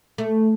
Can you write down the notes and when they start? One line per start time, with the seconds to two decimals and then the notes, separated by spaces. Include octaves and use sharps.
0.18 A3